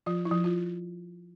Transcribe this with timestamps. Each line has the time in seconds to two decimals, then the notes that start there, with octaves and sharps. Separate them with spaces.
0.06 F3 F4
0.25 E4
0.31 F3
0.44 F4